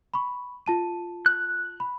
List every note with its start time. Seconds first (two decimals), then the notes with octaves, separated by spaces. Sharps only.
0.14 B5 C#6
0.66 F4 A5 D#7
1.26 F#6
1.80 B5